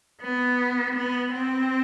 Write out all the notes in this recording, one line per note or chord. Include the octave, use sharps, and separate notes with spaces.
B3
B3
C4